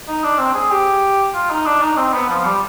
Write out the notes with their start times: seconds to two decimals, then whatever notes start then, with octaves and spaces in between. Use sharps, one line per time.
0.08 D#4
0.24 D4
0.39 C4
0.54 G#4
0.71 G4
1.34 F4
1.50 D#4
1.66 D4
1.82 D#4
1.97 C4
2.13 B3
2.29 F3
2.45 G3